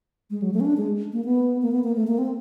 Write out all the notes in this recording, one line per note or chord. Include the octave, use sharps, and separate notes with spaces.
G#3
F#3
A3
C#4
D4
G#3
A#3
B3
A#3
B3
A#3
A3
A#3
C4